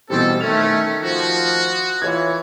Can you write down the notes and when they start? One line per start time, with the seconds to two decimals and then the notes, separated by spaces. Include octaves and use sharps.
0.10 B2 E3 G3 C4 A4
0.40 D#3 A3 C#4 F7
1.03 F3 F#4
2.02 E3 F4 C#5 G#6